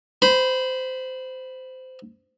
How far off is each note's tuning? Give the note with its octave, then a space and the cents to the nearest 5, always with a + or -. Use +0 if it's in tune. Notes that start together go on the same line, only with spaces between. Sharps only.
C5 -20 B5 +0